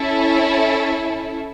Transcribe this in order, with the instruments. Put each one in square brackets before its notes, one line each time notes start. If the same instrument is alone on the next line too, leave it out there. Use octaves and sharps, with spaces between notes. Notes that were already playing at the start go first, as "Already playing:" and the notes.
Already playing: [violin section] C#4 E4 A4